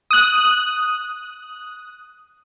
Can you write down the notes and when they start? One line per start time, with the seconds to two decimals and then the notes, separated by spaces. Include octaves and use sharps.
0.11 D#6 F#6